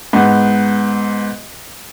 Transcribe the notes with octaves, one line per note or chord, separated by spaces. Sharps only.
G#2 B3